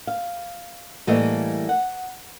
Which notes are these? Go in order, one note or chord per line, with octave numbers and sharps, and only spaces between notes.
F5
A2 E3 G3 A3 A#3 D#5
F#5